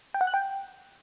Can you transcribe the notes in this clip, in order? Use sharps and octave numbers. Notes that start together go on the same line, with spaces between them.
G5
F#5
F#6
G5